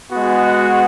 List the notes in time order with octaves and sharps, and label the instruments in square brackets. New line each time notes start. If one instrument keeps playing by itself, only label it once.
[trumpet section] G#3 B3 F#4